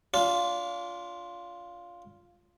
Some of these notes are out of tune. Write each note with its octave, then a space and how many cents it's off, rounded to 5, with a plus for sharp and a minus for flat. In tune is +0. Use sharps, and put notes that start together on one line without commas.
D4 -35 F4 +0